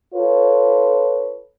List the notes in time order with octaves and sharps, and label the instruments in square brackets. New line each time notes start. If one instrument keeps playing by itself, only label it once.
[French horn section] F4 A4 B4 C#5